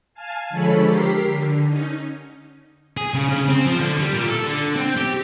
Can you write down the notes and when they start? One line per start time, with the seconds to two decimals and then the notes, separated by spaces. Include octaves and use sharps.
0.14 F5 G#5 A5
0.50 D3 F3 G#3 A4 C#5 B5
0.84 G4 A#4 B6 C7
1.24 D3
1.67 C#4 D#4
2.97 G#4
3.14 C#3
3.29 C#3
3.50 C4
3.65 F3
3.80 D3
3.99 G3
4.14 A#2
4.29 A4
4.47 D3
4.76 C4
4.97 G4